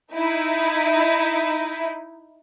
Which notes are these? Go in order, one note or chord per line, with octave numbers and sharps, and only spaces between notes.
D#4 E4